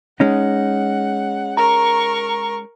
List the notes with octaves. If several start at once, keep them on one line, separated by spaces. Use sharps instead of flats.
G#3 C#4 D#4 F#5
A#4 A#5 C#6